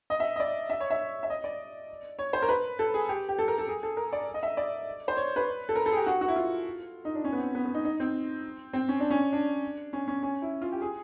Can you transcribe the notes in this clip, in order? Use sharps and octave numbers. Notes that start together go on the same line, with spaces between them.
D#5
E5
D#5
D5
E5
C#5
E5
E5
D#5
D5
C#5
C5
A#4
B4
A4
G#4
G4
G4
A4
A#4
A4
G#4
A4
A#4
D5
D#5
E5
D5
C5
C#5
B4
A4
A#4
A4
G#4
G4
F#4
F#4
E4
F4
D#4
D4
C#4
B3
C4
B3
B3
D#4
D#4
C4
C4
C#4
D4
C#4
D4
C#4
C#4
C#4
E4
F4
G4
G#4